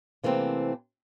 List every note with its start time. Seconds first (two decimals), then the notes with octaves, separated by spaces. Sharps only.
0.23 C3 E3 A3 A#3 C4